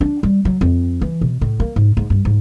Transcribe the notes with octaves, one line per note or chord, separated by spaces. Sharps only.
D4
G3
F#3
F2
E3
B2
A2
A#3
G#2
G#2
G2
G#2